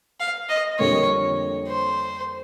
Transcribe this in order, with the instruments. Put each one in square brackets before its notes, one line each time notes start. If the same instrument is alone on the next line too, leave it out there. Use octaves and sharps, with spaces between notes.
[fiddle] F5
D#5
[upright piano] F2 D3 G3 A#3 [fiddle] C#5
[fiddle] C5